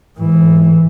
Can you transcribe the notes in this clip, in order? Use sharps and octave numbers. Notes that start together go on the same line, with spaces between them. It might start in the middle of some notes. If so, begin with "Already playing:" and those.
G#2 E3